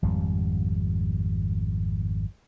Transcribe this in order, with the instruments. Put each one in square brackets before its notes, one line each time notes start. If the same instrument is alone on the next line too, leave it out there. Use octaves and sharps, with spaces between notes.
[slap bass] G#1 F2 G3